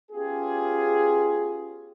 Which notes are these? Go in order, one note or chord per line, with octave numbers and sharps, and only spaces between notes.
B3 C#4 F4 G4 G#4